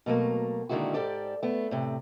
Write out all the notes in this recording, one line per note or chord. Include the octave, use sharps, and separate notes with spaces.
B2 F#3 A3 A#3
A#2 D3 D#3 G#3 E4 F#4
G#2 G4 A4 D5
A3 B3
A2 C3